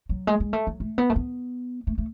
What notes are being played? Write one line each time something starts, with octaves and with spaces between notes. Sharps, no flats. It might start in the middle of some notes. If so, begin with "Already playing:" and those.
F#3
G#3
G#3
A3
F#3
A3
B3
A3
B3
A3
A3